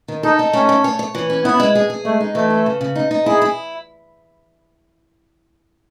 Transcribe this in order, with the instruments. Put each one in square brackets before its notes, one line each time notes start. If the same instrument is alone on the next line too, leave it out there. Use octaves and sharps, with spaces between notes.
[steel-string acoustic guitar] D#3
[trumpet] D#4 [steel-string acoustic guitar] A4
[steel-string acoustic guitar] D#4
[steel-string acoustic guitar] A3 [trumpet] C#4
[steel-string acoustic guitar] A3
C#5
C#5
E3
C#4
[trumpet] B3 [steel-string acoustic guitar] E4
[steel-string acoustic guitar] G#3
G#4
G#4
[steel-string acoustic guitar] G#3 [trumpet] A3
[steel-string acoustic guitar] D#4
[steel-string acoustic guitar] E3 [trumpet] A3
[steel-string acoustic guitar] A4
C#3
C#3
D#4
D#4
[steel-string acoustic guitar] E4 [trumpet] G#4
[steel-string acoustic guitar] E4